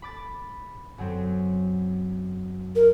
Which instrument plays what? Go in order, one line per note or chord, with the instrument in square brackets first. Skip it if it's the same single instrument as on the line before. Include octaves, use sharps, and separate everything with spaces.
[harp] B5 D6 A6
F#2 F#3 C4
[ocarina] A#4